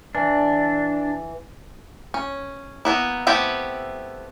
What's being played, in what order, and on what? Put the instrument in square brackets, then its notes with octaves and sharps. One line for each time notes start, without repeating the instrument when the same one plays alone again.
[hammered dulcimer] E3 [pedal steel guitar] D4
[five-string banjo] C#4
A#3 B3 E4
A3 B3 C4 E4 G4